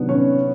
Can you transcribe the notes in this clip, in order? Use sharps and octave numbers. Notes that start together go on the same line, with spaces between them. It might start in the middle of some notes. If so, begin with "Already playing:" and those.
Already playing: C3 D#3 F#3 B3 D4
C#4 C#5